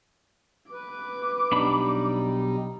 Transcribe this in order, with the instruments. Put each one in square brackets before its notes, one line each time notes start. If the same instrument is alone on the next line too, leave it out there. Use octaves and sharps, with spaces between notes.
[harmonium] B4 [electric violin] D6
[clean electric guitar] B1 D4 B5 [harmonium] G3 D#4